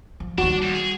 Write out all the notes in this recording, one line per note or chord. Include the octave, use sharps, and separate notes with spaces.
F3
D#2 G3 D4 F#4
F2
G#4